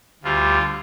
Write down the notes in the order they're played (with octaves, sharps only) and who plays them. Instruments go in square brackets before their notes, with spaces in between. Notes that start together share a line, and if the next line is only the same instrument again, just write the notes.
[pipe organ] D2 D3 G3 F4